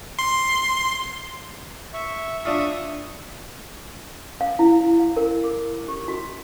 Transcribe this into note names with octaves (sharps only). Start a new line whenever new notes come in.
C6
E5 C#6
D4 F4 E5 C#6 D#6
F5
E4
F5
A#4
D6
G4
F#4